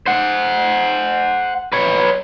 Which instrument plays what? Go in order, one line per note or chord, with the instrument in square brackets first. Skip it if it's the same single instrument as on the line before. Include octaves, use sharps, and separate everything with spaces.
[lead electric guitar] C5 F#5
B4 C#5